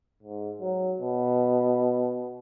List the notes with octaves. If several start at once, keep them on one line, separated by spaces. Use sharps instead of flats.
G#2
F#3
B2